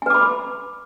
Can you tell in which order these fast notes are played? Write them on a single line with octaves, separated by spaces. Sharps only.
G#5 B4 D6 B5